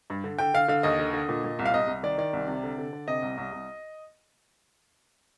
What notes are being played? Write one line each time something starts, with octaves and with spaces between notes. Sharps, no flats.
G2
D3
D3 G5
D3 F5
D3 F5
D#2 D#5
D3
D3
A#2
A#2
C2
F5
C2 D#5
C2
D#3 D5
D#3 D5
C2
C3
D3
D3
D3
C3 D#5
C2
C2
C2